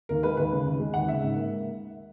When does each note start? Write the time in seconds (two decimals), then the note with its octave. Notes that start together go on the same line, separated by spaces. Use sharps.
0.09 D#2 A#4
0.23 G#3 B4
0.37 D#2 B4
0.52 C#3
0.66 D#2
0.79 G#3
0.94 D#2 F#5
1.08 C#3 E5
1.22 G#2
1.36 A#3